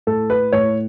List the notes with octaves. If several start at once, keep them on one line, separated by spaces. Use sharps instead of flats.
A2 A4
B4
A2 C#5